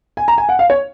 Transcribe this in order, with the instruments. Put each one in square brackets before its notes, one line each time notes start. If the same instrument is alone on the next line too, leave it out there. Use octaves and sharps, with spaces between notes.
[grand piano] G#5
A#5
G#5
F#5
F5
C#5